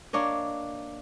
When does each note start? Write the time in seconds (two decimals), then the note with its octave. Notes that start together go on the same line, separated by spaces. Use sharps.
0.13 A#3 D4 C#5 D#5